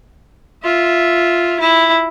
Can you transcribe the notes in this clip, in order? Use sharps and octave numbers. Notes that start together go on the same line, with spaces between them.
F4 E5
E4